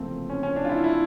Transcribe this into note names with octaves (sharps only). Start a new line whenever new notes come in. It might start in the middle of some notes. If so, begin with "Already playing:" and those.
Already playing: C#2 C3 E3 F3 A3 A#3 C4
C#4
C#4
D4
F4
E4
E4